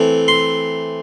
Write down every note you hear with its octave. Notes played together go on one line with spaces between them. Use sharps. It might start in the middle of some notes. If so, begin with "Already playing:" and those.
Already playing: E3 A3 C4
C6